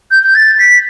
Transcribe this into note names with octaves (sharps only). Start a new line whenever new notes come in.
G6
G6
A6
B6